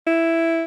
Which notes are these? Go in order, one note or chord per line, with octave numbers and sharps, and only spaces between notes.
E4